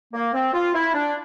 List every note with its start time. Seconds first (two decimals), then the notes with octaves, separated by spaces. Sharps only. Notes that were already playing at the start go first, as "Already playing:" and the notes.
0.13 A#3
0.33 C4
0.54 F4
0.74 E4
0.94 D4